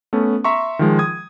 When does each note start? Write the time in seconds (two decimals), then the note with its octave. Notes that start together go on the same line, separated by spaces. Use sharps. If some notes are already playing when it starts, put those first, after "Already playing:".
0.13 A3 B3 C#4
0.44 E5 A#5 C6 C#6
0.79 D#3 F3 G#3
0.99 D#6 G#6